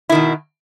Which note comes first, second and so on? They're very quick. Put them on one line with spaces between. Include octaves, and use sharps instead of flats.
E4 D#3 B2